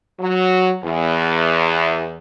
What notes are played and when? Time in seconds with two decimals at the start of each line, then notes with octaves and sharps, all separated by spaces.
0.20 F#3
0.84 E2